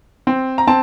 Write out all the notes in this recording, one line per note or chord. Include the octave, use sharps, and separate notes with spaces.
C4
A#5
C4 A5